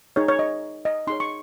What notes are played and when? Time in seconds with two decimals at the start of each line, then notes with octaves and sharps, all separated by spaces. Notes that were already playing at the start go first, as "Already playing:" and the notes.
0.16 D#4 G#4 C#5
0.28 C#5
0.39 D#5
0.85 D#5
1.07 D#4 G#4 C#5 C6
1.20 C#6